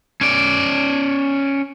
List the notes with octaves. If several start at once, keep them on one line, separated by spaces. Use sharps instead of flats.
C#4 D5